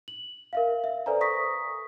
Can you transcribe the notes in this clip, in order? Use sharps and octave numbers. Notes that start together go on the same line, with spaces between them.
F#7
A#4 E5 F5
E5
A4 B4 C5 D5 G#5 A#5
A#5 C#6 D#6 A#6 B6